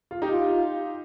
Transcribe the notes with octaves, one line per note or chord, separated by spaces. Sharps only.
F4
D#4 G4
F4